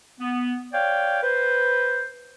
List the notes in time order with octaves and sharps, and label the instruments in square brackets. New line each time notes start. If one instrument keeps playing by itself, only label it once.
[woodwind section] B3
C#5 D5 F5 G5
B4 C5